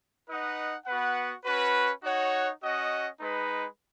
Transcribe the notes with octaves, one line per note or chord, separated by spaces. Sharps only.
D#4 B4 D#5 F#5
B3 F#4 B4 F#5
C#4 F#4 B4
D#4 F#4 C#5 F#5
C#4 F#4 D#5 F#5
G#3 D#4 B4